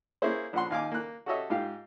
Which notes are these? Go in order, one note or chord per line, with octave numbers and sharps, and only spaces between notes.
A#3 C#4 E4 G#4 C5
A#1 F3 F#5 C6
D#2 F5 G#5 D6
A#3 F#6
F#4 G4 A4 C#5 D#5 E5
G#2 F4 G4 F5